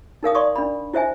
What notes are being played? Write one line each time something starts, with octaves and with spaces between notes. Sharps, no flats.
D#4 A#4 F5 D#6
D5 C6 C#6 D#6
D4 B5
E4 C5 E5 G#5